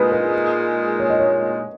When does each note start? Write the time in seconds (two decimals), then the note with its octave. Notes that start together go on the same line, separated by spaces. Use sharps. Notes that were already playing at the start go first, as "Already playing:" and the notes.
Already playing: A#2 G#3 D#4 B4
0.12 B4
1.00 C#5
1.10 D#5
1.20 C#5